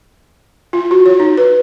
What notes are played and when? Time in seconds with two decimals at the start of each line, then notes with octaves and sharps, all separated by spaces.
0.73 F4
0.91 F#4
1.06 C#5
1.20 D#4
1.38 B4